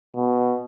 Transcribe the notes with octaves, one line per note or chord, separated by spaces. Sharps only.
B2